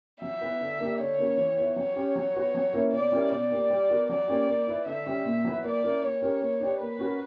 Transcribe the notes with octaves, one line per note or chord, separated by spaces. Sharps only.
F#3 E5
B3 E4 B4
D3
A#3 D4 G4
D3 C#5
A#3 C#4 F#4
E3
B3 E4 B4
F#3 C#5
C#4 G4
F#3
B3 F#4 B4
F#3
A#3 C#4 E4 B4
B2 D5
G3 C#4 E4 A#4
B2 D5
A#3 D4 G4
G3
B3 F#4 A#4
F#3 D5
A#3 C#4 G4
A#3
E4 B4
D3 E5
G3 C#4
A#2
F#3 B3 E4 B4
A#3 D5
C#4 E4 A#4
A#3 C#5
C#4 G4 A#4
A#3
D4 G4 B4
A#3 B4
C#4 F#4 A#4